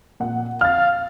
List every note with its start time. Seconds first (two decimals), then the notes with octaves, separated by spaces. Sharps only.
0.20 A#2 F#5
0.61 F5 F6 A6